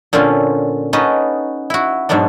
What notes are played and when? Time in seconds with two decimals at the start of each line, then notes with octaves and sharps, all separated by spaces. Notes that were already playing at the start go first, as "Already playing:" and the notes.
0.13 A#2 D3 C4 C#4 F4
0.93 C#4 D#4 F#4 B4 D#5 A5
1.70 E4 F#4
2.09 G#2 B2 F#3 B3 D4